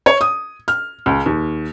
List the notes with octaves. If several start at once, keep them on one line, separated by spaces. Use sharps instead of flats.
C#5
D#6
F6
C#2
D#2